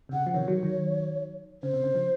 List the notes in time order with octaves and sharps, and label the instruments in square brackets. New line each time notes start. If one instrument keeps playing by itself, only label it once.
[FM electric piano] C3
[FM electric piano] C#3 [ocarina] F#5
[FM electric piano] F3
[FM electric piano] C3 D#3 [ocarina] C#5
[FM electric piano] D#3 F#3
D#3 F#3
[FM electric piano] C#3 [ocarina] C5
[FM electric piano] C3
C#3
C#3 F3